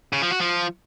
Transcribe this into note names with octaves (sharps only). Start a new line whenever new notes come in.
C#3
F3
F#4
F3